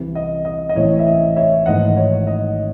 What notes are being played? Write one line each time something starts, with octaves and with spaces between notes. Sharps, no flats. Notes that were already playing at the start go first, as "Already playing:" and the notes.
Already playing: C2 C3 E3
D#5
D#5
D#5
A1 A2 E3 A3 C4 C#5
E5
D#5
C#5 E5
G#1 G#2 E3 A3 D#5 F#5
C#5
D#5